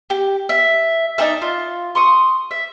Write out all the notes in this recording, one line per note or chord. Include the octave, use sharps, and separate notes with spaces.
G4
E5
D4 D#4 G#4 E5
F4
C6 C#6 D#6
E5